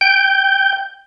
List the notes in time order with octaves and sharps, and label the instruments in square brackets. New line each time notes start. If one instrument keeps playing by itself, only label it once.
[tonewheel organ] G5 G6